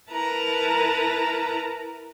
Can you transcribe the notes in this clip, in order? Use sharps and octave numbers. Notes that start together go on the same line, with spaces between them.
E4 A#4 B4 A5 A#5